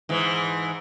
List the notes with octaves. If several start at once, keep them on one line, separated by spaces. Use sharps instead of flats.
G#2 E3